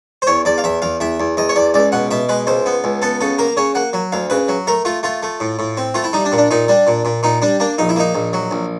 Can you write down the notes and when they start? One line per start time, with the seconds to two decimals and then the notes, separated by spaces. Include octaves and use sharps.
0.22 C5
0.27 E2 C#5
0.45 E2 D5
0.58 F5
0.64 E2 E5
0.82 E2 F5
1.00 E2 E5
1.20 E2
1.37 E2 D#5
1.49 C#5
1.56 E2 D5
1.74 C#2 D5
1.92 B2 F#5
2.11 B2 E5
2.29 G#3 B4
2.47 C#2 C5
2.66 B3
2.84 C#2
3.02 B3 A4
3.21 C#3 A4
3.39 A#3 A#4
3.57 C#3 C#5
3.75 A#3 F#5
3.93 F#3
4.12 D2 F5
4.30 C#3 B4
4.48 F#3
4.67 A3 A#4
4.85 A3 F4
5.03 A3 F4
5.23 A3
5.40 A2
5.59 A2
5.77 C4
5.94 A3 F4
6.04 E4
6.13 G3 D#4
6.25 D4
6.32 A#2
6.38 D4
6.51 A#2 D#4
6.68 G3 D4
6.87 A#2
7.05 A#2
7.23 A#2 D#4
7.42 G3 D4
7.60 A#3 D4
7.78 A#1 D#4
7.89 E4
7.96 A#3 D#4
8.14 A#1
8.33 F#3
8.51 A#1